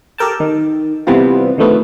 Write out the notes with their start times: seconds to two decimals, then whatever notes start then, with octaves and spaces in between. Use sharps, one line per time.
0.18 G4 A4 A#4 G5 A5
0.40 D#3
1.07 C3 E3 G3 B3 C4 F4
1.58 D3 D#3 F3 A3 B3